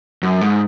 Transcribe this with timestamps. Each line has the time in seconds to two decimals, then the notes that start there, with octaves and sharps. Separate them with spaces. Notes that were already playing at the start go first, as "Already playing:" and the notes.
0.23 F#2
0.41 G#2